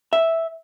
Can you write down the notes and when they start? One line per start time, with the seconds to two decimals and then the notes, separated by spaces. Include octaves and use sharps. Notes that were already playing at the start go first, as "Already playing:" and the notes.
0.13 E5